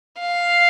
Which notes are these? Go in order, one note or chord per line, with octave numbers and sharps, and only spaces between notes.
F5